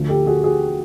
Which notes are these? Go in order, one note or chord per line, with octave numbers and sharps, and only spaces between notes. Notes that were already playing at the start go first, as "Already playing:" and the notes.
Already playing: D2 D3 F3 A3
G4 A4
F#4 G#4
F#4 G#4